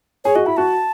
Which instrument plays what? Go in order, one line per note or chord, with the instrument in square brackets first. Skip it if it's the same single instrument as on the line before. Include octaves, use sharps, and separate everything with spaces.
[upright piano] G#4 [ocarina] C#5
[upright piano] F#4 [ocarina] D#5
[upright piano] E4 [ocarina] B5
[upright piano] F#4 [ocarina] A5